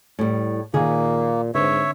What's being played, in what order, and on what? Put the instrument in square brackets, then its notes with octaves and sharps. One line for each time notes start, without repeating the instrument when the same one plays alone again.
[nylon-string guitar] A2 G3
[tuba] A#2 [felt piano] D#3 [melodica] A#3 [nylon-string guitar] G#4
[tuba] G#2 [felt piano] D3 C4 B4 [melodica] C#5 E5